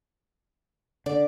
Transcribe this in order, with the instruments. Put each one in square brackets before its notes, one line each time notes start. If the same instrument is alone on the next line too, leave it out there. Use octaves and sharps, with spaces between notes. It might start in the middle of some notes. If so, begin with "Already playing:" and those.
[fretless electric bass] D3 [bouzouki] D5